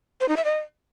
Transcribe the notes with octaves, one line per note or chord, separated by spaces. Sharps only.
C5
D#4
E5
D#5